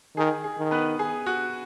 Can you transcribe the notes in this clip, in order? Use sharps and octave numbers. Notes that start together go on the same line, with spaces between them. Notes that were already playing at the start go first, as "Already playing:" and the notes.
D#3 G#4
G#4
D#3
B3 B4
G#4
F#4